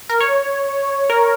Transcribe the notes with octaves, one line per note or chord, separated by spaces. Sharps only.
A#4
C#5
A#4